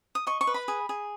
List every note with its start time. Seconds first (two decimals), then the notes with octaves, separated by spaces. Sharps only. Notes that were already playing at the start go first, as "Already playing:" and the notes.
0.15 D#6
0.27 D#5 C#6
0.41 C#6
0.47 B4
0.54 B5
0.68 G#4
0.89 G#4